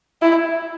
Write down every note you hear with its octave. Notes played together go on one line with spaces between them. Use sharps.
E4